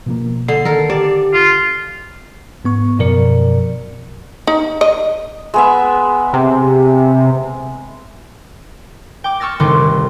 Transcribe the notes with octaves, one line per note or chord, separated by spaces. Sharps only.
B2 F3 A#3
D3 C7
D#3 A4 A#4
G4 D5
F4
G#2 B3 C#6
F#2 B2 F3 A#4 D5 C#7
D#4
D#5
G#3 B3 E5
C3
G5 D6
C#6 E6 F6 A6 A#6
G1 C2 D#3 A3 C6 D6